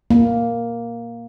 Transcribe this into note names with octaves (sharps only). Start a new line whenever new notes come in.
A#3